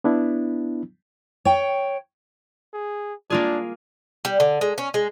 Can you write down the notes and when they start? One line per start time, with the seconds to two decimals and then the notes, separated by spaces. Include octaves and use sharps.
0.04 B3 D4 E4
1.45 C#5 G5
2.73 G#4
3.30 A#3 D4 F4 G#4
4.25 G3
4.40 D3
4.61 G#3
4.78 C#4
4.94 G#3